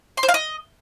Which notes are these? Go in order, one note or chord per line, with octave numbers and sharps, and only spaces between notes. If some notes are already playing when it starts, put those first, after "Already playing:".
C6
C5
F5
D#5